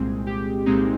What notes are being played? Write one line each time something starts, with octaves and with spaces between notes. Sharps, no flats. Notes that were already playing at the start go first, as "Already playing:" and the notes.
Already playing: C2 A#2 G#3 C4 G#4
G4
C2 A#2 G#3 C4 D#4